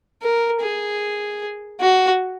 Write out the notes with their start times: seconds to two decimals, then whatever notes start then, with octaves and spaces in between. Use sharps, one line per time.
0.22 A#4
0.61 G#4
1.80 F#4